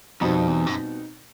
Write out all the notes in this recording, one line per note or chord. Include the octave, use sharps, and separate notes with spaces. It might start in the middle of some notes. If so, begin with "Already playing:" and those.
F2 B2 G3 C4 D#4
E2
F#2